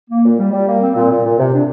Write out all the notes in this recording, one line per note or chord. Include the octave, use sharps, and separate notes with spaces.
A#3
A#2
G3
G3
A#3
C4
A#2
A#2
A#2
C3
D4